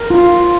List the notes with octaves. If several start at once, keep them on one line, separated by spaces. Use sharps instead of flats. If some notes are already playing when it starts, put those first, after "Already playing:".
Already playing: A#4
F4